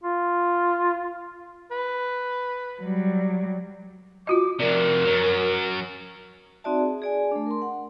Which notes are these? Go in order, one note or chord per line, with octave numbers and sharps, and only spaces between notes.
F4
B4
F#3 G3
F4 F#4 D#5 D6
F2 C3 A#4 D5
F#2 F#3
C4 D#4 F#4 D5 E5 A5
G#4
G#4 D5 G#5
A3 D4
A#4 C6
F#5